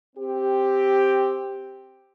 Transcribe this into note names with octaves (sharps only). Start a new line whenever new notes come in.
C4 G4